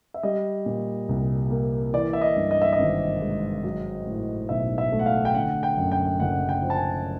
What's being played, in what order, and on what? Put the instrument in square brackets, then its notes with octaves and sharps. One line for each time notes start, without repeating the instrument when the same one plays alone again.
[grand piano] E5
G3 D#5
A#2
C2
A#3
E3 D5
E5
D#5
G2
D#5
E5
D#5
G#1
G#3
F#3
A2
B1 E5
E5
A3
F#5
F5
G5
D3 F#5
G5
F#2
G5
F#1 F#5
G5
F3
A5
G#5